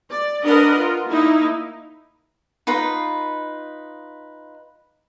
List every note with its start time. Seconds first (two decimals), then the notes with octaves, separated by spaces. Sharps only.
0.10 D5
0.45 D4 A#4 B4 D#5 F#5
0.77 F4
1.08 A#3 D#4 E4
2.67 D#4 F4 B4